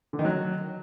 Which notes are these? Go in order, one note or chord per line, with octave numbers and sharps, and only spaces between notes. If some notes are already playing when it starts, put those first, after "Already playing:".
D3
D#3
F#3